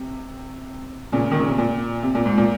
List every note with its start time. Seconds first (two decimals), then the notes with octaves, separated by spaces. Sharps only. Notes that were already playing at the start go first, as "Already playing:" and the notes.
Already playing: C3
1.12 A#2 C#3
1.31 D#3
1.40 C#3
1.49 C3
1.58 A#2
2.03 C3
2.15 A#2
2.26 G#2
2.38 A#2